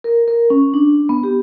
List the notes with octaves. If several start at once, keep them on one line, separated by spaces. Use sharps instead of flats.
A#4
A#4
C#4
D4
B3
G4